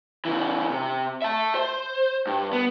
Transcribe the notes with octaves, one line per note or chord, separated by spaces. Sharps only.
C#3 E3
C3
E5 A5
C5
G2
B3